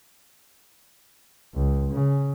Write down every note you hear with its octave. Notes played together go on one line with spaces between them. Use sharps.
C#2
C#3